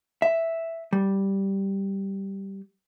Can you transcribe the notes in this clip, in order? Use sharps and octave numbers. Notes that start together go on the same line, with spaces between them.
E5
G3